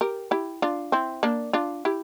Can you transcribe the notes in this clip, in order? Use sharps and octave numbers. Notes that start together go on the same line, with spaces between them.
G4 A#4
E4 G4
D4 F4
C4 E4
A#3 D4
D4 F4
E4 G4